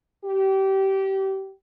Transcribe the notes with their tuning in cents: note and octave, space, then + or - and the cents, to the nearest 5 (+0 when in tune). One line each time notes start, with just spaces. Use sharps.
G4 -25